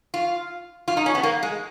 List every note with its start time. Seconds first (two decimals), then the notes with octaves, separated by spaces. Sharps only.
0.14 F4
0.88 F4
0.97 D#4
1.06 C#4
1.15 B3
1.23 A#3
1.43 G#3